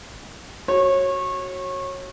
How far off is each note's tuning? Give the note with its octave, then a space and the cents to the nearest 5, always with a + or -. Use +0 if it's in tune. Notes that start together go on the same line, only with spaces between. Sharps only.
F#4 +10 C#5 -25